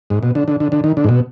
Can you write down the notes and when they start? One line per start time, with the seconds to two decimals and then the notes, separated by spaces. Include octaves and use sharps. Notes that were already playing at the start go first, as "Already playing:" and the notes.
0.10 G#2
0.23 B2
0.35 D3
0.48 D3
0.60 D3
0.72 D3
0.84 D#3
0.97 D3
1.04 G#2
1.09 B2